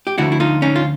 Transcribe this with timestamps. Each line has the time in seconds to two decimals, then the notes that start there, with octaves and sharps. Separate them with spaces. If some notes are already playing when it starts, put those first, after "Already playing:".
0.07 G4
0.18 D2 D3 F3 E4 F#4
0.32 E4
0.40 D#4 F4
0.62 C#4 D#4
0.76 F4